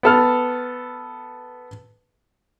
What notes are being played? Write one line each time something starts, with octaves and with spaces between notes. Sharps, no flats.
B3 A4 F6